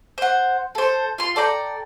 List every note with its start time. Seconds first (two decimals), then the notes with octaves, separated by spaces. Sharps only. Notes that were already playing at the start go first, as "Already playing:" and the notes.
0.18 C5 F#5
0.75 A4 C5
1.18 F4 C6
1.36 A4 D5 G5 A#5